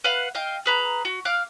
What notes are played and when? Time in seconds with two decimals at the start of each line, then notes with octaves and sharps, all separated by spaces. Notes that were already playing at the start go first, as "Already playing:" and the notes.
0.04 B4 F5 F#5
0.35 D#5 F5 G5
0.66 G#4 B4 A#5
1.05 F#4
1.25 F5 D6 F6 F#6